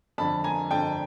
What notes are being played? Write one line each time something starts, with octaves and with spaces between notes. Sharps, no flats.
F2 D3 A5 B5
G#5 A#5
F2 D3 G5 A5